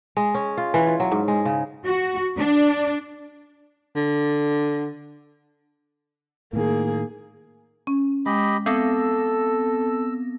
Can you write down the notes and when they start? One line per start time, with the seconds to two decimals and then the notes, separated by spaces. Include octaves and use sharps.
0.17 G#3
0.34 C#4
0.57 F4
0.74 E3
0.87 F4
1.00 F#3
1.12 G#2
1.28 G#3
1.45 C#3
1.85 F#4
2.38 D4
3.96 D3
6.53 A2 D#3 A#3 G#4
7.87 C#4
8.26 G#3 G4 D#5 B5
8.66 B3 C4 A4 E6 A#6